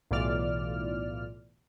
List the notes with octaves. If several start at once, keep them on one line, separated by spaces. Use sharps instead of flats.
B1 A2 E3 F4 D5 F6